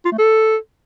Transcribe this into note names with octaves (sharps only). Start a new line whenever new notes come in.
F4
A3
A4